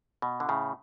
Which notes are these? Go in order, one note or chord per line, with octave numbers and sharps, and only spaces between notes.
B2
D3
A2 C#3